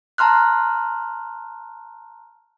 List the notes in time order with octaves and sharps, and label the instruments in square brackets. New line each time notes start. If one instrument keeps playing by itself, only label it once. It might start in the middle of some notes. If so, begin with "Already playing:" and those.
[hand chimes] A5 A#5 C6 F6 F#6